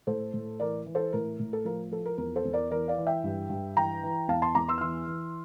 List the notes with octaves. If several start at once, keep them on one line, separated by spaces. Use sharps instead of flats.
A2 A4 C5
A2
E3 A#4 D5
E3
A4 C5
A2 A#4
A2
A4
F3 A#4
F3 A4
A#4
E2 A#4
A4 C5
E2
A#4 D5
E3 A#4 D5
D5 F5
E3
E5 G5
G2
G2
E3 G5 A#5
E3
E2 F5 A5
A5 C6
E2 A#5 D6
C6 E6
F6
E3 C6 E6
E3